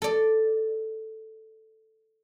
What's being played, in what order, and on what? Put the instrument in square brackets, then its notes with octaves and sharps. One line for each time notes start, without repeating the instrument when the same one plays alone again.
[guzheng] A4 D5